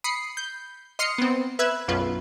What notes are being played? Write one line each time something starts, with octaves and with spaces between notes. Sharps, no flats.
B5 D#6 C7 C#7
G6
D#5 C6 D#6 F6 C7 C#7
B3 C4
B4 E5 E6 F#6 G#6
B1 F#2 F4 B4